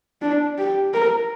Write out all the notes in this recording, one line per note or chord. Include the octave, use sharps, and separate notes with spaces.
D4
G4
A#4